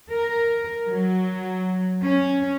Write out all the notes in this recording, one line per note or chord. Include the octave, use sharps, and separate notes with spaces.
A#4
F#3
C#4